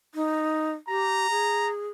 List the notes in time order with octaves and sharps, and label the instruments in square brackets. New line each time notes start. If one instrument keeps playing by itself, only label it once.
[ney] D#4
[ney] G4 [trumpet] A#5
[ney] G#4